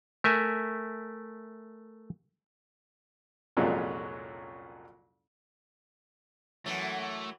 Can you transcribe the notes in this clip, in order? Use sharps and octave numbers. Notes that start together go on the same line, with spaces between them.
A3 A#4 E5 G#5
C2 F2 A#2 F#3 G#3 C#4
F#2 E3 F#3 A3